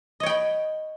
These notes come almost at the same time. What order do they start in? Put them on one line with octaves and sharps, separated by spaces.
D#5 C#5 G5 B5